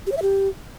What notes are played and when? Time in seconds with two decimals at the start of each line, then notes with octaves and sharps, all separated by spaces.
0.07 G4
0.12 C#5
0.17 E5
0.22 G4